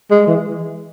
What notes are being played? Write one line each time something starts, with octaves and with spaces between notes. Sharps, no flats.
G#3
E3